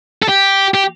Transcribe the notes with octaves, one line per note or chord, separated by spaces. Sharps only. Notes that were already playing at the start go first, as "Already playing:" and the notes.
A4
G4
G4